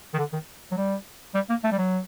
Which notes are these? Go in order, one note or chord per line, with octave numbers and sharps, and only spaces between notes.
D#3
D3
D#3
F#3
G3
G3
A#3
A3
G3
F#3